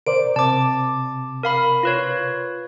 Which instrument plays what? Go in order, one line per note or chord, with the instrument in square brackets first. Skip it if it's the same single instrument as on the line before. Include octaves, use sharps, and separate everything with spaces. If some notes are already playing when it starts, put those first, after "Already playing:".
[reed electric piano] A#4 C5 D5 [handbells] D7
[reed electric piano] C3 [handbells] A5 D6
[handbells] A#4 F5 B5
F4 B4 C#5